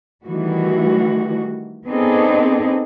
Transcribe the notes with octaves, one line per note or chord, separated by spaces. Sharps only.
D#3 E3 G3 A3 F#4
B3 C4 D4 D#4 G#4 A4